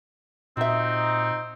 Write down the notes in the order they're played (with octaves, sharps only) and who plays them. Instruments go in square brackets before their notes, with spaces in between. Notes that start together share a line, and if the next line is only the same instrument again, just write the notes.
[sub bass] A#2 [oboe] C4 [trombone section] D#4 [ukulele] F#4 E5